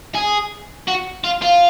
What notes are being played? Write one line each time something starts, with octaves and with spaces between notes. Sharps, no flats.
G#4
F#4
F4
F4